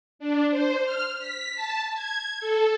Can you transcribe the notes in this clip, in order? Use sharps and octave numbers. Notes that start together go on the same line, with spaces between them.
D4
C5
F6
B6
A5
G#6
A4